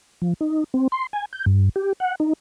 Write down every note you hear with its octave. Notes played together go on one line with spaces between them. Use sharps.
F3
D#4
C4
C6
G#5
G6
G2
G4
F#5
D#4